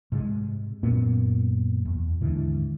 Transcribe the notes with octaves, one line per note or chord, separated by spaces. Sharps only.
G#2 C3 G#3
F#2 A#2 A#3 B3
E2
D#2 G#2 D3 E3